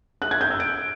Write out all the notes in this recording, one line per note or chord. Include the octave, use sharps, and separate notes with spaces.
F#6
G#6
G6
E6
D7